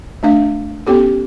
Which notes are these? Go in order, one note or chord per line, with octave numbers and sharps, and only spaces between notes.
A3 D4 F5
B3 C#4 G4 A4